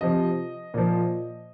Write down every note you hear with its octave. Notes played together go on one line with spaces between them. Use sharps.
C3 F3 D#5
A#2 F3